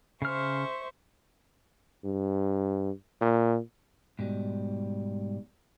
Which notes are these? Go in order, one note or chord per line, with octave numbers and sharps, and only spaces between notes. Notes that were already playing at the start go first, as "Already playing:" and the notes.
C#3 C5 E5 C#6 F6
G2
A#2
G#2 B2 G3